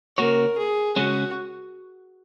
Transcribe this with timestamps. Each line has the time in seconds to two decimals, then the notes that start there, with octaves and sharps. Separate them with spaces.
0.18 C#3 A#3 F#4 A#4 C#5
0.57 G#4
0.96 C#3 G#3 C#4 F#4